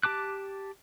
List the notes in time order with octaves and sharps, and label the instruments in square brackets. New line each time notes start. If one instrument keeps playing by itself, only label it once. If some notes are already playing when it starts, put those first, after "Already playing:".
[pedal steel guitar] G4 A5 D6 F#6